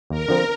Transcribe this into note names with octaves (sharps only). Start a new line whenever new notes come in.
D#2 A#4
D3 F3 C4